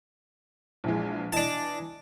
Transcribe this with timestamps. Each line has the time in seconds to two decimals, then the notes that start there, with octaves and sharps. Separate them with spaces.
0.84 A#1 E3 G#3
1.33 E3 D4 D#5 A5